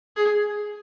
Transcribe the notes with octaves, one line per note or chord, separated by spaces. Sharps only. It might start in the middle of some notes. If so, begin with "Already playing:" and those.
G#4